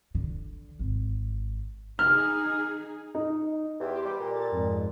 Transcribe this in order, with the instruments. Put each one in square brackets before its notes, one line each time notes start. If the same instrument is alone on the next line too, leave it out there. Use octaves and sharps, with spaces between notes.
[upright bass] D3
G#1
[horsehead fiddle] D#4 G#4 [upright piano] F6
[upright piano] D#4
[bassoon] E2 [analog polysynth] G4 C5
[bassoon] G3
A#2
[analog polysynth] A4 A6
F2 G#2